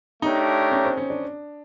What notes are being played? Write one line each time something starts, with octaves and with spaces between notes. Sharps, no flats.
A3 D4 D#4 G4 A#4 C#5
C#4
C4
C#4
D4